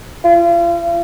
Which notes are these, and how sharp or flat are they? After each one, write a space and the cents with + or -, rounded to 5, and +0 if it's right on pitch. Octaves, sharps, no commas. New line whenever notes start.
F4 -40